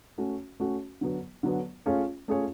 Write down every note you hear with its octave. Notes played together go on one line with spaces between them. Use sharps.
A3 C#4 F#4
A3 C#4 F#4
D3 F#3 B3
D3 F#3 B3
A3 C#4 F4 G#4 C#5
A3 C#4 F4 G#4 C#5